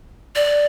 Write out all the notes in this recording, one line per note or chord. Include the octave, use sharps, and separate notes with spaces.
D5